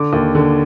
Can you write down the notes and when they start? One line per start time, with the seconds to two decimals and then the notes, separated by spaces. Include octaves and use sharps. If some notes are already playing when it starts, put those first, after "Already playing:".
Already playing: D3 D6
0.13 D#2
0.35 D3